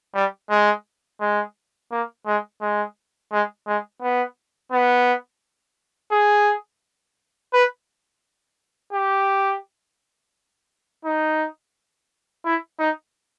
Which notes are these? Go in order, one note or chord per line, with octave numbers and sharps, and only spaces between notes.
G3
G#3
G#3
A#3
G#3
G#3
G#3
G#3
B3
B3
G#4
B4
G4
D#4
E4
D#4